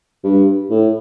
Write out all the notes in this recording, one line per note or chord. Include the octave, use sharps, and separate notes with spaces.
G2
A2